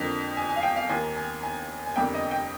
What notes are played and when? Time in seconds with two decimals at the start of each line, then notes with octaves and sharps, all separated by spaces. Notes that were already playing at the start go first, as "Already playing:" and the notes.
Already playing: F2 D3 F3 A#3
0.37 G#5
0.49 G#5
0.56 F5
0.63 G5
0.76 F5
0.89 D#2 D#3 A#3 G#5
1.16 G#5
1.43 G#5
1.86 G#5
1.96 F1 F2 D3 G3 A#3 G5
2.14 D#5
2.31 G5